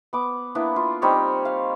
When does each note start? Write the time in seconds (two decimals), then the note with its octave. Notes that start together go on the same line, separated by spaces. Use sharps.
0.13 B3 D6
0.55 A#3 B3 D4 E4
0.76 F4
1.02 G3 C4 D#4 C#5
1.45 F5